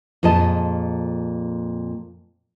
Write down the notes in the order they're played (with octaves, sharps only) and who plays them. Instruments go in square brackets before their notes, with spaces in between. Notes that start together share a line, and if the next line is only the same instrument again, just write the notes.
[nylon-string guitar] F2 A#2 G#4 D#5 A5